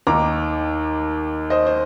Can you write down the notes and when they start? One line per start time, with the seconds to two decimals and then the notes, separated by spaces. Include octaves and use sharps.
0.07 D#2 D#3 A#5 D6
1.50 C5 D#5
1.67 C5